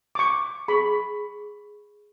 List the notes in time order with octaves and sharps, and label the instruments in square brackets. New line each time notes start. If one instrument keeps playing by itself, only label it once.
[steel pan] C#6 D6
[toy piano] G#4 C#6 [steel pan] B5